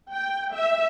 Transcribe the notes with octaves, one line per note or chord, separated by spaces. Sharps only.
G5
E5